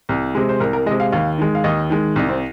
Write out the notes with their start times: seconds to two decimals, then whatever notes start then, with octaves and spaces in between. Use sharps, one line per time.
0.09 C2
0.35 C3 G#3
0.49 C5
0.60 C2 A#4
0.73 A#4
0.86 G#3 D#5
0.91 C3
1.00 F5
1.12 D#2 F5
1.38 D#3 G#3
1.55 F5
1.64 D#2 D#5
1.90 D#3 G#3
2.16 C2 D#4
2.29 C4